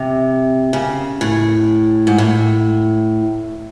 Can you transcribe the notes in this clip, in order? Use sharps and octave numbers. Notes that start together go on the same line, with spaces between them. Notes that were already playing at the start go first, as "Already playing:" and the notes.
Already playing: C3
C#3
A2
G#2
A2